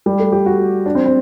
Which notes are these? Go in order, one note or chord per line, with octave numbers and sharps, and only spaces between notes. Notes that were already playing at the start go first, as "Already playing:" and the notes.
G3
A3
G4
F#4
D4
C4
C4